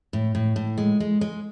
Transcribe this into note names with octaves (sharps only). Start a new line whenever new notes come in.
A2
A2
A2
G#3
G#3
G#3